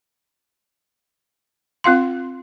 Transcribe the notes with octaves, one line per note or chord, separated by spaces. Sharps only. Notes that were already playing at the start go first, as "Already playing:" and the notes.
C4 F4 F5 C6